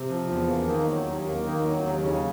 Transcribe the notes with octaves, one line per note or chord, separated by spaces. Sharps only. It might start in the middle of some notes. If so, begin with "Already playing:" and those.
Already playing: C3
F3
E2
A#3
D#3
F#3
D#2
A#3
D#3
F#3
D#2
C#3